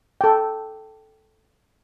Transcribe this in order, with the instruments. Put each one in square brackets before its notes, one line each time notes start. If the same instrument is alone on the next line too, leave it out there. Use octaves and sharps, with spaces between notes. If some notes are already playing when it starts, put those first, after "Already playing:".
[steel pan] A4 G5